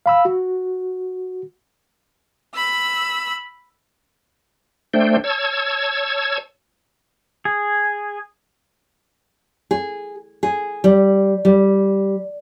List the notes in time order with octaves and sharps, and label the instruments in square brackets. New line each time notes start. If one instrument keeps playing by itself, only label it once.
[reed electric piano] F5 B5 E6
F#4
[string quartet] B5 E6
[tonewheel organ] A3 D4 C5 G5
C#5 A5 E6 G#6
[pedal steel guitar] G#4
[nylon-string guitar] G#4
G#4
G3
G3